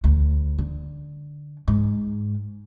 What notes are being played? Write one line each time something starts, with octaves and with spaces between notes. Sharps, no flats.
D2
D3
G#2